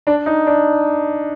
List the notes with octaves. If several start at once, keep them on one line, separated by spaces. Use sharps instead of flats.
D4
D#4
D4